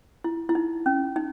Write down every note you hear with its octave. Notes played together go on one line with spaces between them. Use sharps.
E4
E4
D#4
C#4
D#4